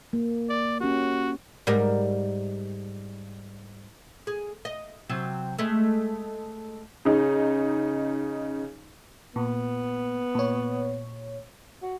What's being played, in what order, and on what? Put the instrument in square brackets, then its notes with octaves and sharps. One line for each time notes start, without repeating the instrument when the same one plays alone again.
[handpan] A#3
[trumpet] D5
[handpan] C#4 G4 [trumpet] F#4
[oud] G#2 G3 A#4
G#4
D#5
C3 F#3 C4
G#3 A3
[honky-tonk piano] C#3 D#4
[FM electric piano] A#2 [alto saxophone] B3
[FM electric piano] A#2 C#5
[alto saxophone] F#4